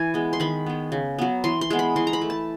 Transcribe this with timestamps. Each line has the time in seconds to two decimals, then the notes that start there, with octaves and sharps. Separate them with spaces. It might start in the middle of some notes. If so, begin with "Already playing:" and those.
Already playing: E3 G#5
0.14 G#3 B3
0.33 C6
0.40 D#3 B5
0.66 G#3 B3
0.92 C#3
1.18 F#3 B3
1.44 E3 C6
1.61 C6
1.70 G#3 B3
1.79 B5
1.96 E3 C6
2.07 A#5
2.13 B5
2.21 A3
2.30 A5